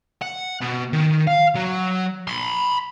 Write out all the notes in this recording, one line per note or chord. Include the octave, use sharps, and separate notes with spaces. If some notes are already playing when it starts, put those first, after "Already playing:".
F#5
B2
D#3
F5
F#3
B5 C6